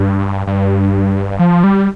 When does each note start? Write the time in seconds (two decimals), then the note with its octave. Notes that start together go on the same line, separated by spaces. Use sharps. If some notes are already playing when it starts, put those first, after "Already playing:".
Already playing: G2
0.47 G2
1.39 F3
1.64 G3